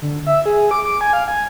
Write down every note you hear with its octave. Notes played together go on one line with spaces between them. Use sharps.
D3
E5
G#4
D6
D6
G#5
F5
G#5